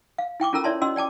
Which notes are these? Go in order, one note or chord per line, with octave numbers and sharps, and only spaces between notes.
F5
E4 G5 C#6 D6
C#4 F4 A4 A#4 A#5 E6
E4 C#5 D5 E5 A5 C6
C#4 F#4 D#5 C6 E6
D5 G5 A5 D6